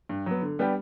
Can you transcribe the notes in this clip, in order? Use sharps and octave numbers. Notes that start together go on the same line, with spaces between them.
G2
F#3 B3
D3
G3 B3 D4 G4